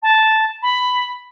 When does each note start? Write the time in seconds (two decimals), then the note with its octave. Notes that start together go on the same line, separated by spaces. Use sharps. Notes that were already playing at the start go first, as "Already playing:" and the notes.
0.02 A5
0.62 B5